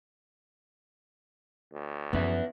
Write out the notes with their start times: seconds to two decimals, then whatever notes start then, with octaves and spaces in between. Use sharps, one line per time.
1.73 D2
2.13 F#2 F3 B3 E4